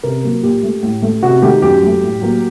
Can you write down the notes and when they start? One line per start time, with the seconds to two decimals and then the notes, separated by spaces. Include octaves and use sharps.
0.03 C3 A#4
0.24 F#3 A#3
0.43 A#2 G4
0.63 A3
0.83 A2
1.02 A3
1.23 C3 F#4
1.42 D#3 A3 G4
1.62 F#2 G4
1.82 F#3 A3
2.02 A2
2.21 F#3 A#3